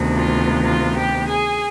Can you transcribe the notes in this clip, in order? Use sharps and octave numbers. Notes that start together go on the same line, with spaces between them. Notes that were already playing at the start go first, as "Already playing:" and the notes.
Already playing: D2 C3 D#3 B3
F4
F4
G4
G#4